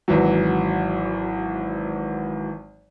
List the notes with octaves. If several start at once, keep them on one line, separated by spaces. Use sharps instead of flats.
G#1 E3 F#3